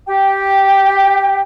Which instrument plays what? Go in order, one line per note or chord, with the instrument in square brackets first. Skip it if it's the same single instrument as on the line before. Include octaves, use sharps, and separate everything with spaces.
[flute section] G4 G5